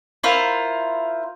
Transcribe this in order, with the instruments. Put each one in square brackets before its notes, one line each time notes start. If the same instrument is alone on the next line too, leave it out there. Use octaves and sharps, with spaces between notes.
[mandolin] E4 F4 A#4 C5